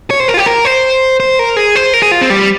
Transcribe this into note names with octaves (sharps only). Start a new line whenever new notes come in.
C#5
C5
A#4
F4
G4
A#4
C5
C5
A#4
G#4
C5
A#4
G#4
F4
C4
G3